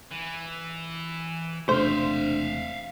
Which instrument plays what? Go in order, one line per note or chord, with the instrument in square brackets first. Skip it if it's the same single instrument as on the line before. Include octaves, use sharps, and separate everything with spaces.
[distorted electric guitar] E3
[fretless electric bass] E1 C3 A3 [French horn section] D4 [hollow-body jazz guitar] C5 [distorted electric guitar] E5 F5